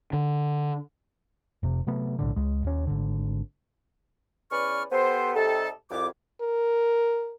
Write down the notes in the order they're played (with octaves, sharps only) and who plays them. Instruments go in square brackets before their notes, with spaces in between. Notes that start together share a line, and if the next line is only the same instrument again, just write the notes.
[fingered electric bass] D3
[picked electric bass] F1 C3
C3 F#3 A3 B3
B1 A2 D3
C#2 G#3
D#2 C#4
G#1 D3
[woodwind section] E2 C#4 B4 D5 C#6 F6
B3 G4 A4 C5
C3 G3 D#4 A4
C2 F2 D6
[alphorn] A#4